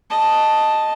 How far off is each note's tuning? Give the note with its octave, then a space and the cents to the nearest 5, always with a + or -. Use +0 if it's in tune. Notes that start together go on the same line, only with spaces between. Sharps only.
D#5 +0 A5 +0